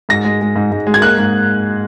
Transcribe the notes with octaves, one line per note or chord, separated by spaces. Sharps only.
G#2 A#6
G#3
G#3
G#2
G#2
G#3
G#6
A#3 F#6
G#2